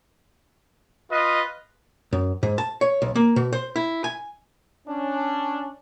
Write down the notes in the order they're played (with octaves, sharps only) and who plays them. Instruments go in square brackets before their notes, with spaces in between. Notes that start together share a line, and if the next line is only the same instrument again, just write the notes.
[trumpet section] F4 D#5 [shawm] B4
[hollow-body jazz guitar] F#2
G#2
A5
C#5
B1
A#3
B2
C5
E4
G#5
[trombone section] C#4 D4